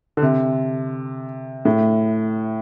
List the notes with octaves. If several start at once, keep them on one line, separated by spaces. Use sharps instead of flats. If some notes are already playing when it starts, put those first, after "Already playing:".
D3
C3
A2